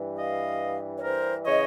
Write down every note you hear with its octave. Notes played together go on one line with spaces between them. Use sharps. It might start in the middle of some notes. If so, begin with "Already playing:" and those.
Already playing: G2 E3 G3
D#5 F5
C#5
A#4 C5
C#3 E3 C#5 D#5